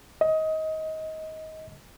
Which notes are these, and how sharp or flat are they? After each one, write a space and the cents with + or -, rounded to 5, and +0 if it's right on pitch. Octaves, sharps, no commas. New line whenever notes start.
D#5 +20